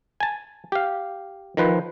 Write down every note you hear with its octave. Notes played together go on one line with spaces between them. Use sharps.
G#5 A5
G4 F5
D#3 F3 B4 C5